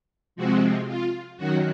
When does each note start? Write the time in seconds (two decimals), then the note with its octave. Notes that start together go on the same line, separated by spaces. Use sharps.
0.36 C3 F3 G#3 C4 F#4
0.87 F4
1.37 F#2 D#3 F#3 F#4